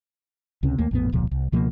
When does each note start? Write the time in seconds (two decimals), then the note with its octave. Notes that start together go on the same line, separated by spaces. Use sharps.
0.63 C#2 C3 C#4
0.78 D#2 A3 A#3
0.91 A#1 F2 A2 B3
1.12 E1 C#2 A#2 F3
1.31 C2
1.52 C#2 B2 F3 A#3